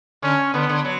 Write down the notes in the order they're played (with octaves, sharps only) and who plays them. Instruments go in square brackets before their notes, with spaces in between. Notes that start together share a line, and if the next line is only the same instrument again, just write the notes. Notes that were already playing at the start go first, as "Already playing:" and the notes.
[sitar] D3 [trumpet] C#4
[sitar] D3 [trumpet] B3
[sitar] D3
F#3